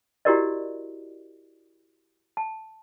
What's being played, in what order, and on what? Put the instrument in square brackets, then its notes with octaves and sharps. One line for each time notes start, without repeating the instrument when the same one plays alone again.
[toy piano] E4 F#4 G4 A#4 D5 D#5
A5